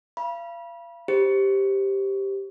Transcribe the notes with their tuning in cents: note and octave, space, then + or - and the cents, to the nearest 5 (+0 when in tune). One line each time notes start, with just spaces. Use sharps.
F5 -35 B5 -30
G4 +0 C5 +10